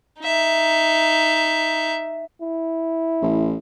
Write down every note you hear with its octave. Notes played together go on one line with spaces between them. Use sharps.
D#4 E5
E4
A1